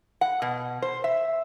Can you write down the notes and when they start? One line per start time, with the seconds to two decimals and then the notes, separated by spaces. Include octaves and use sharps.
0.21 F#5
0.42 B2
0.82 C5
1.04 E5